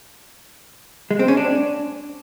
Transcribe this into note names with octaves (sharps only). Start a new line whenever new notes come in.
G#3
C4
C#4
D4